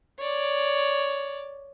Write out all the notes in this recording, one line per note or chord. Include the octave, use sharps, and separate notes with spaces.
C#5 D5